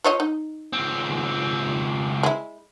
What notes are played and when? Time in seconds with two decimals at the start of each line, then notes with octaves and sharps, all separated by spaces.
0.04 F3 C#5 D#5
0.20 D#4
0.73 C#2 C4
2.23 G#3 E4